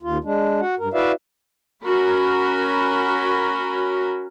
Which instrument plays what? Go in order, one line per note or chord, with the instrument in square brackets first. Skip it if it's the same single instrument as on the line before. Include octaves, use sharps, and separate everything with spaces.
[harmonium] D#2 F4
G#3 D4
F#4 F#5
G2 A#4
E4 F#4 B4 D5 E5 F5
[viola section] C#4 F#4 A#4 B5